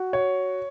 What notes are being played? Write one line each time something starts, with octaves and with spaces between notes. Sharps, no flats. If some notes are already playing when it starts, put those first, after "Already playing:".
Already playing: F#4
C#5